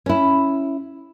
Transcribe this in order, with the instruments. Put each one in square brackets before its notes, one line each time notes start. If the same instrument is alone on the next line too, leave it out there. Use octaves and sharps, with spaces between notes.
[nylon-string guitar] C#4 E4